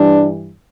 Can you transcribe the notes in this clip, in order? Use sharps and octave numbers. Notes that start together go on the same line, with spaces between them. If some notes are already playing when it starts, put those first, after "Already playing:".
Already playing: G2 E3 G3 D4